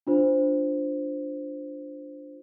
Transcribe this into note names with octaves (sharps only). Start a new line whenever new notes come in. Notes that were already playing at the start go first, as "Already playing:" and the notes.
D4 F4 C5